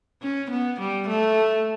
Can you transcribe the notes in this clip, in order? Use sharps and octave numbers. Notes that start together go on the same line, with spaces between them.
C#4
B3
G3
A3